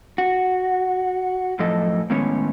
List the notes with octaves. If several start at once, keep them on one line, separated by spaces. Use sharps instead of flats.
F#4
F#2 A2 F3 A4 D#5
A2 D#3 G#3 B3 C#4 C#5